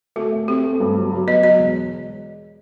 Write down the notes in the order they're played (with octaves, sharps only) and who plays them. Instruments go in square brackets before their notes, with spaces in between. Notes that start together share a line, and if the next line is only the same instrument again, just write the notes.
[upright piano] A3 [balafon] F#4
[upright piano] A3
[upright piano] C4 [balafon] G4
[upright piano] A3
G2
F#3
F#3
[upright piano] B3 [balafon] D#5
[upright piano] F#3 [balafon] D#5
[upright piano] E1